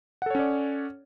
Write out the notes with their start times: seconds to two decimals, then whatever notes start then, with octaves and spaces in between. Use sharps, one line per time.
0.22 F#5
0.26 A4
0.30 C#5
0.35 C#4
0.39 D5